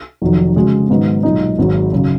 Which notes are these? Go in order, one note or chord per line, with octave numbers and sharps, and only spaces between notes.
F1 F2 D#3 F#3
C#3 G#3 C#4 F#4
G#2 D#3 F#3 B3 D#4
B1 A#2 G#3 D#4
G#1 G#2 F#3
F#2 C#3 F#3